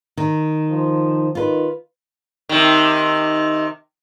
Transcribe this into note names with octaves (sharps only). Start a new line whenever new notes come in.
D#3
F3
D#3 F4 B4
C3 D#3